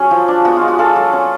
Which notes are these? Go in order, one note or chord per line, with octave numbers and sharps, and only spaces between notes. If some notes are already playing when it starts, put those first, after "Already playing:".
Already playing: F#3 C#4 F#4 G#4
F3
D4
B3 F#4
G#3 F4
F#4
F4 F#4 A4
F#3
C#4